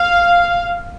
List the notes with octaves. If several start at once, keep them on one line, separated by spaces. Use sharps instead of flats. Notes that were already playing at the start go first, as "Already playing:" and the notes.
Already playing: F5